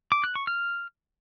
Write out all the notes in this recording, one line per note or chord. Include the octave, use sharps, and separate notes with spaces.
D6
F#6
C#6
F6